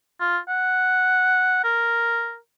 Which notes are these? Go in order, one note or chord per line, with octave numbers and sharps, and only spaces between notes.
F4
F#5
A#4